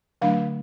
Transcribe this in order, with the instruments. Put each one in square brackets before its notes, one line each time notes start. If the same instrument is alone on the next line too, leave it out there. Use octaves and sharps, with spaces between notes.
[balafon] D3 F#3 A3 D4 F5